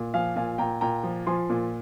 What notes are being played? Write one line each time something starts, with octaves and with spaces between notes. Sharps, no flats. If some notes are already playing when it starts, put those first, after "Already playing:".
Already playing: A#2
F3 F5 G#5
A#2 F5 G#5
A#2 G5 A#5
A#2 G5 A#5
F3
F3 G#5 C6
A#2